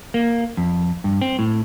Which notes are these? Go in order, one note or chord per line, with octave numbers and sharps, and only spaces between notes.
A#3
F2
G2
C4
A2